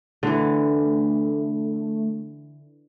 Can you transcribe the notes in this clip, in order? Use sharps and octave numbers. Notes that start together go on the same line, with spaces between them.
D3 E3 A3